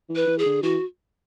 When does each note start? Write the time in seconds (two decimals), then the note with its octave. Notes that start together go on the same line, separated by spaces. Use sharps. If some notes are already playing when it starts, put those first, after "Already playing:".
0.09 E3
0.16 B4
0.27 E3
0.39 G#4
0.45 D3
0.63 E3 F#4